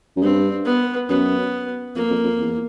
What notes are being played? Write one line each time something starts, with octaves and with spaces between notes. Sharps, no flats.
F#2
G2 C4
B3
F#2 B3
F2 A#3
F2
F2
E2